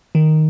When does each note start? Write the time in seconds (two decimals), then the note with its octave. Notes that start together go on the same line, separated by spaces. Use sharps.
0.15 D#3